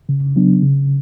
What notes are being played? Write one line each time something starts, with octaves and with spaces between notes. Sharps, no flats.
C#3
F#3 B3 D4
C#3